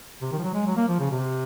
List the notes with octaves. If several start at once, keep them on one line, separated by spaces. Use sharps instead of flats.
C3
D#3
F3
F#3
G#3
F#3
A#3
F3
C#3
C3